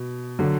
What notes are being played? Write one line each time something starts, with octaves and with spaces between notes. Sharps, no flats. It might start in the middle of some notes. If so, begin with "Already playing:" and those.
Already playing: B2
D3 F#3